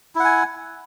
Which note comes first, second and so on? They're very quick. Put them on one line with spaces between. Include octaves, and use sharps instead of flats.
E4 F#5 G#5